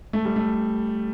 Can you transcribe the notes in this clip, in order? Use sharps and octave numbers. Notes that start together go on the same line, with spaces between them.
A3
G3
A3